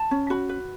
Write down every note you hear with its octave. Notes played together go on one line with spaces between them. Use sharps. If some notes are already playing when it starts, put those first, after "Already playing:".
Already playing: A5
C#4
F#4 B5
B4